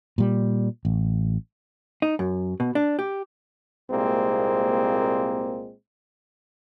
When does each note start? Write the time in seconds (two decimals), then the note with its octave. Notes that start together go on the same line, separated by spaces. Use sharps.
0.18 A#2 G3
0.85 A1
2.02 D#4
2.19 F#2
2.60 B2
2.75 D4
2.99 G4
3.91 C2 A#2 G#3 A#3 C4